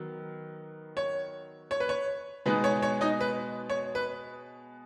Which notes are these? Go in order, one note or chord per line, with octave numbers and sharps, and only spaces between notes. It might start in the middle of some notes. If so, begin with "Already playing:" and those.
Already playing: D#3 F#3 B3
C#5
C#5
B4
C#5
B2 G#3 B3 D#4 B4
C#5
C#5
D#4 D#5
B4
C#5
B4